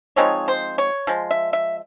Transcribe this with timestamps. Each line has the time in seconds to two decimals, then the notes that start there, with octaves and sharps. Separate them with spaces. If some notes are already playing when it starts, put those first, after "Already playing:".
0.16 F3 G#3 C4 D#4 C#5
0.48 C5
0.78 C#5
1.07 F3 G#3
1.31 E5
1.53 E5